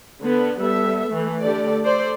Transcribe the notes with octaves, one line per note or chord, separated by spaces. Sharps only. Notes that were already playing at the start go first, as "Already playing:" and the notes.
D3 B3
G3 B3 A4 E5
E3 A3
D3 A3 G4 A4 D5
A4 C5 D5